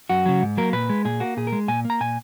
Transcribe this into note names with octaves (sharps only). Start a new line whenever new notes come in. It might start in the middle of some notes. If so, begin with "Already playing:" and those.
F#2 F#4
C#3 F#3
G#2
F#3 A#3 A#4
A#2 B4
G#3
A#2 G#4
A#3 F#4
A#2 G#4
A#4
G#3
A#2 G#5
A#3
A#5
A#2 G#5